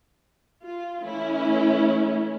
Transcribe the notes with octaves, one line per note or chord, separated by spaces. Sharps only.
F4
E3 A3 C#4 E4